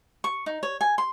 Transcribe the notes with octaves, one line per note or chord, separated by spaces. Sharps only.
C#6
D#4
C#5
G#5
C6